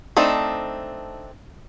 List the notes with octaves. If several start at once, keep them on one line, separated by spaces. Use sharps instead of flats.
A3 C4 D4 D#4